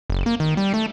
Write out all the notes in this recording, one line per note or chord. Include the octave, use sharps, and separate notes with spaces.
F#1
A#3
D#3
G3
A3